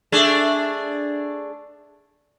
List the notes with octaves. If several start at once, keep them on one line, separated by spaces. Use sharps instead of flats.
A3 D4 G#4